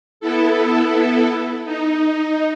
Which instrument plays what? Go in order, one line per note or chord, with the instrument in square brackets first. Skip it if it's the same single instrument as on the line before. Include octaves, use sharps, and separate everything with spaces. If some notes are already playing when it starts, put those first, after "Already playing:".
[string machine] B3 E4 A4
D#4